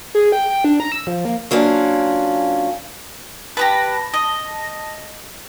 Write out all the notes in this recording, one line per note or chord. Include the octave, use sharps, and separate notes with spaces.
G#4
G5
G5
D4
A#5
E6
F3
A#3
F#3 A#3 C#4 D4 F4
G4 G#4 B4 A5 A#6
D#5